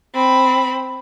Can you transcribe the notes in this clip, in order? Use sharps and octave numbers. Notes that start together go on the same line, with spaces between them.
C4 B5